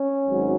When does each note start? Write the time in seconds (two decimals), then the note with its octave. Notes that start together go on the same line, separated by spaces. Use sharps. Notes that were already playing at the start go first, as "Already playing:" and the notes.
Already playing: C#4
0.26 G#1 G#2 F#3